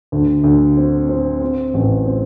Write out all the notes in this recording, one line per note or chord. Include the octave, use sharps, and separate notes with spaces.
D2
D2
C4
C4
C4
A1
C4